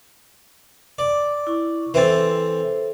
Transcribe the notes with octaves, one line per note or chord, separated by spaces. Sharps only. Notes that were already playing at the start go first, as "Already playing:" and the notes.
D5
E4 C#6
E3 C4 A4 C5